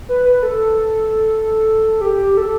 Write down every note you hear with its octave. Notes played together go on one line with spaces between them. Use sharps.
B4
B4
A4
G4
A4